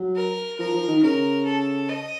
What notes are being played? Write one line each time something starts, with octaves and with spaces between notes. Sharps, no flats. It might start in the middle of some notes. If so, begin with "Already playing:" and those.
Already playing: F#3
A#4
F3 A#4
F3
D#3
C#3 A#4
A4
D#5